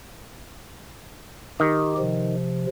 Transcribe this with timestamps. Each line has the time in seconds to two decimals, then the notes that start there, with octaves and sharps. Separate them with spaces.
1.60 D#3 G4
1.98 C3 F3